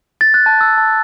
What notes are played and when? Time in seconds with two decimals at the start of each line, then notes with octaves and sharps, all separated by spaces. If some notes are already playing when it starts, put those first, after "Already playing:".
0.21 A6
0.34 F#6
0.46 A5
0.61 E6
0.78 A5